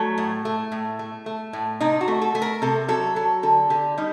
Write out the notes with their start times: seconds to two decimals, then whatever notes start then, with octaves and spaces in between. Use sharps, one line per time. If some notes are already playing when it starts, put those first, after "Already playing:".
Already playing: F#3 A3
0.18 A2
0.45 A3
0.72 A2
0.99 A3
1.26 A3
1.53 A2
1.80 C3 D#4
2.01 F#4
2.08 A3
2.22 A4
2.35 A3
2.42 A#4
2.62 C3 A4
2.88 F#3 A4
3.16 F#3 A4
3.43 D3 A4
3.70 D3 G4
3.97 G3 D#4